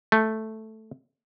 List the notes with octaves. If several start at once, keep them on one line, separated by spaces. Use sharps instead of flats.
A3